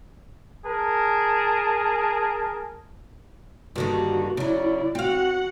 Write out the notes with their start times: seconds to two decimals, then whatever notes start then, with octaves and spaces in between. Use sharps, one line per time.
0.65 G#4 A#4 A5
3.76 G2 D3 D#3 A#3 F#4
4.37 C#3 F#3 E4 D5
4.95 C4 F#4 F5 F#5